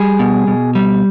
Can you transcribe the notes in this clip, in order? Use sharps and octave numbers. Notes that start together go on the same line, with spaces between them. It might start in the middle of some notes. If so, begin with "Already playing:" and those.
Already playing: G3 G#4
B2
B2
G3